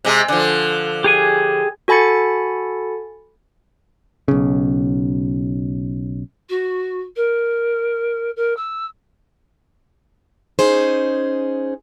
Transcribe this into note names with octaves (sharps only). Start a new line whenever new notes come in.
C3 G#3
D3 F3
G4 G#4 G#5
F#4 A4 G#5 B5 A6 C#7
B1 C#3
F#4
A#4
A#4
E6
C#4 D#4 G#4 C5